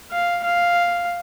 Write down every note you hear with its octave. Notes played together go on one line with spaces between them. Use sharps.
F5
F5